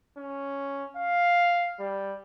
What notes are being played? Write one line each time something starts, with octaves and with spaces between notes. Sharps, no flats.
C#4
F5
G3